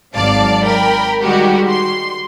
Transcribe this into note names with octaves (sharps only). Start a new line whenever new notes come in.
G#1 F#3 D5 F5 A5
A#4 G5 B5
D#3 G3 G#3 F#4 G4
C6